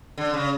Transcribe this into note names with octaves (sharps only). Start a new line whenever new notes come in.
D3
C#3